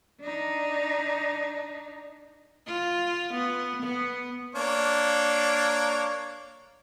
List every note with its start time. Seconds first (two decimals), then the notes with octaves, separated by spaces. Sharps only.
0.21 D4 D#4
2.66 F4
3.34 B3
3.82 B3
4.55 A#3 D4 C#5